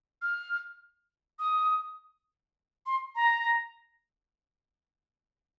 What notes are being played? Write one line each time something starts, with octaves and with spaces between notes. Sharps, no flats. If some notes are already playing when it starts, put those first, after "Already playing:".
F6
D#6
C6
A#5